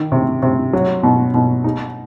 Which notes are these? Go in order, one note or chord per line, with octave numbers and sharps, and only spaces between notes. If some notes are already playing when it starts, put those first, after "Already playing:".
Already playing: D#3
C3
C3
F#3
B2
B2
D#4